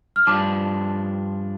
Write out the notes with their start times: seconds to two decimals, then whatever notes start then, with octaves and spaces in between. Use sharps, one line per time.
0.16 F6
0.27 G2 F3 D4 A5 D6